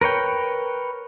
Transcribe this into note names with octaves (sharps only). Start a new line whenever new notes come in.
A#4 B4 C#5 G5